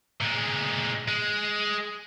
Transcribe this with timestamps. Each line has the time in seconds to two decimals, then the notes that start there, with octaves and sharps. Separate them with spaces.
0.21 A#2 G#3
1.08 G#3